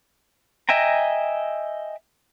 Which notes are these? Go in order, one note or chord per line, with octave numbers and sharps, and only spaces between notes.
D#5 E5 G5 G#5 A#5